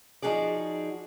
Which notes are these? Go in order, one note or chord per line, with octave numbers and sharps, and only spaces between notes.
F3 D#4 F#4 G#4 D5